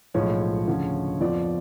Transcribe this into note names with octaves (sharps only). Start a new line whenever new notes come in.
B1 A2 F3 G#3 C#5
D2 C#3 F3
F2 F3 B3 F4 D5